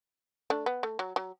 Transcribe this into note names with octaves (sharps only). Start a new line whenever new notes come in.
A3 D4
B3
A3
F#3
F#3